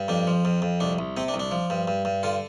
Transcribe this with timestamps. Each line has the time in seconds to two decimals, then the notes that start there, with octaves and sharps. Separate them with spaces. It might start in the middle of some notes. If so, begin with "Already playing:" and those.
Already playing: G2
0.08 F2 D4
0.27 F3
0.45 F2
0.62 F2
0.80 C2 D4
0.99 C2
1.17 C3 C4
1.28 D4
1.34 C2
1.39 D4
1.51 F3
1.70 G2
1.88 G2
2.05 G2
2.23 D3 F4